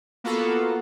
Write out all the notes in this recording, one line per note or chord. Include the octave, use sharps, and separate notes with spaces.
A#3 B3 F4 F#4 A4